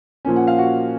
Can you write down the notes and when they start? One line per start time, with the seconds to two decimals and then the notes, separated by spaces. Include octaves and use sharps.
0.25 A#2 F3 A#3 C#4
0.36 F#5
0.47 F5
0.58 F#4 F#5